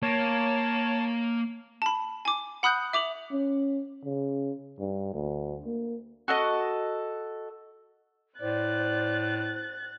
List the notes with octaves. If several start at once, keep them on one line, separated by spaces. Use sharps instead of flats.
A#3 C#5 A5
A5 B5
G#5 D6
F#5 B5 D#6 F#6 G6
E5 D6 F7 F#7
C#4
C#3
G2
D2
A#3
F#4 A4 D#5
A2 C5 D5 F#6 A6